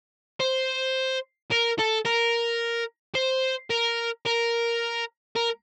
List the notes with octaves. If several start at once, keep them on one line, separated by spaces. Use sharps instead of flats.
C5
A#4
A4
A#4
C5
A#4
A#4
A#4